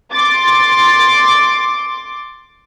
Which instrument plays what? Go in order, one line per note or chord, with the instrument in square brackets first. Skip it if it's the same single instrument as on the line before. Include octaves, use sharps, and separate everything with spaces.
[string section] C6 D6 A6